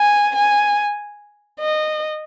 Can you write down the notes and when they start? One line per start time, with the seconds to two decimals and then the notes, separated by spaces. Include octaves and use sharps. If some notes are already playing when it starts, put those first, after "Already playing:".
Already playing: G#5
0.36 G#5
1.60 D#5